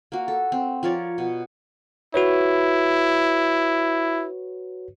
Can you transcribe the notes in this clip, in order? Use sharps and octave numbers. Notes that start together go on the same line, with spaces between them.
A#3 F#4
A4
C4
F3 A#4 C#5 D5
B2
E4 F#4 B4 C#5